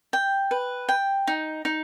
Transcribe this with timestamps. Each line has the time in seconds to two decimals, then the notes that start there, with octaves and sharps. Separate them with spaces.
0.13 G5
0.51 B4
0.89 G5
1.27 D#4
1.65 D#4